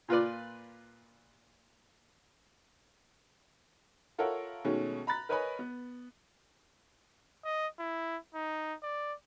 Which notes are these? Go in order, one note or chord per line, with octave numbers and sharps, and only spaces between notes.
A#2 F4 B4 D5
F4 A4 A#4 C#5 E5 F#5
B2 D#3 G#3 A3 C#4
A#5 B5 F#6 A6
A#4 B4 C#5 D#5 G#5 B5
B3
D#5
E4
D#4
D5